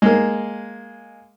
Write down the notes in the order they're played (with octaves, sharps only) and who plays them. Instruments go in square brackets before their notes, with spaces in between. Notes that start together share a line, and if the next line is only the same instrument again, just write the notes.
[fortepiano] G#3 A#3